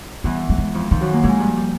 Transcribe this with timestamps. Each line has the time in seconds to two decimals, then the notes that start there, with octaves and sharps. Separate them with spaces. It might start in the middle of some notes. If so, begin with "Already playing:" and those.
0.24 E2 E3 G3
0.49 G3
0.58 G#3
0.74 F2 F3
0.91 F2 D#3 F3
1.01 F#2 F#3
1.13 A#2 A#3
1.23 G#2 F3 G#3
1.40 G2 G3
1.57 G3